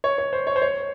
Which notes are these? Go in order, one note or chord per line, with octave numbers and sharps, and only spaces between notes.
C#5
C#5
C5
C#5
C5
C#5